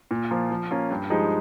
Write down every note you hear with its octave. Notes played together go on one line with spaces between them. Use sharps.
A#2
F3 A#3 F4
F3
A#3 C#4 F4
G2
F3 G#3 D#4 G4